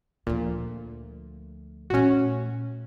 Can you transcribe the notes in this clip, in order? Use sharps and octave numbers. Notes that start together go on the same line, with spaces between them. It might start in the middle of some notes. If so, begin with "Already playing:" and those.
D2 A#2 F3
A#2 A3 C#4 F#4